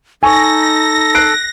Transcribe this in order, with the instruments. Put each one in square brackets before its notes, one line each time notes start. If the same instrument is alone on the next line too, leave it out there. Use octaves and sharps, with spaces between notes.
[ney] D#4 [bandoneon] A4 [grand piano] G#5 C#6 [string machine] A#6
[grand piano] F#6 C7 D7